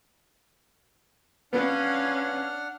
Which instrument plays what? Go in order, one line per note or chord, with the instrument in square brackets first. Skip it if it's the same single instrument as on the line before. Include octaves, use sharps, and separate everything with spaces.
[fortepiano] B3 [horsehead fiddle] C#4 F5 [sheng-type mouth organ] D4 F#5 F6